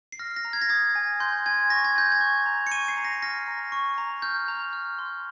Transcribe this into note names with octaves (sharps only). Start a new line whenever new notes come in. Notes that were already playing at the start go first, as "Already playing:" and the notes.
C7
F6 A#6
A#6
A#5
G#6
A#6
D#6 G#6
G#5
C6 G6
G#5 G#6
C#6 A#6
G#6
G#5 G6
G#6
C#6
A#5
C#7
C#6 D#7
C7
A#5
A#6
F6 A#6
A#5
C#6
A#5
F6 G6
A#5
F6
C6